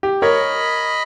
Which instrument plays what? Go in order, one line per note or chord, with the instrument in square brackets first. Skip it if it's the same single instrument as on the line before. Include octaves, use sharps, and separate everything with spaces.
[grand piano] G4
[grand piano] A#4 C#5 [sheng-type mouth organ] D#5 B5